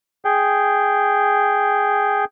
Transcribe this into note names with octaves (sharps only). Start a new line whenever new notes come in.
G#4 G5